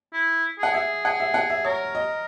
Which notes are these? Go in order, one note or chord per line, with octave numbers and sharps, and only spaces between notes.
E4
G#4 F#5
G#4 E5
G#4 F#5
E5
F#5
E5
A#4 C#5
D#5